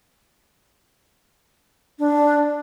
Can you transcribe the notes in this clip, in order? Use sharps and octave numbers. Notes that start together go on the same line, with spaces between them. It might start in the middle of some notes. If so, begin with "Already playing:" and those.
D4